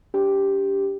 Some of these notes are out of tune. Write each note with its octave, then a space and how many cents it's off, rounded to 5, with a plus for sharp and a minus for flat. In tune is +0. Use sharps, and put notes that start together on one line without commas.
D4 -45 G4 +0